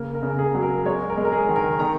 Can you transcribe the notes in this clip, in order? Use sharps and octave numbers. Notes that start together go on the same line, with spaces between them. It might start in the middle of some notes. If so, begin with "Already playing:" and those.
Already playing: C#3 A#3 A#4
A#4
C#3
A#4
G#4
F#3
A#4
G#3 C#5
A#4
G#3
A#4
G#4
D#3
A#4
D#3 A#5